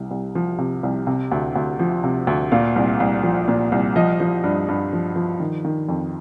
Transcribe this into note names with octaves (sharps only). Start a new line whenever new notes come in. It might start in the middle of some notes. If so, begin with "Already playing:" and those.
Already playing: C2 C3
C2
F3
C3
C2
C3
D2
D2
F3
C3
D2
A#2 F5
C2
C2
F3
A#2
C2
F3 D#5
F3
G2
G2
F3
F3
D#3
D#3
F2